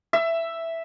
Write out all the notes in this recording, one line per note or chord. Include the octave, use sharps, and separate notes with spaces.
E5